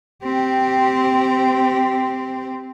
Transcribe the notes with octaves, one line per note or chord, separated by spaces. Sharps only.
C4 G4